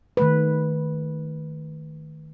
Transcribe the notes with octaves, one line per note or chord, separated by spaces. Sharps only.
D#3 A3 B4